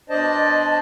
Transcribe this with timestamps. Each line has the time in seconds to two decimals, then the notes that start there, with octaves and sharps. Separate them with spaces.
0.10 B2 D4 C5 D5 D#5 A5